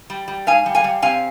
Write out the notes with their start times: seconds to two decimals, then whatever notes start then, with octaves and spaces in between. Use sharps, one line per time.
0.10 G3
0.28 G3
0.47 G#2 F5 G#5
0.66 G3
0.75 F5 G#5
0.84 G3
1.02 C3 F5 G#5